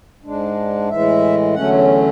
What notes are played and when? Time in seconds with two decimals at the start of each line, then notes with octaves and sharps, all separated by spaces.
0.24 G#2 G#3 D4
0.89 A2 E3 G#3 E5
1.55 E2 D3 F#3 A3 C#4 F#5